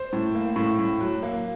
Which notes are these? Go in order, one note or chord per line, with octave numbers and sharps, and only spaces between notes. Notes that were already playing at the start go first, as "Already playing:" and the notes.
Already playing: C5
A2
A#3
A2
A2
F#3
A#3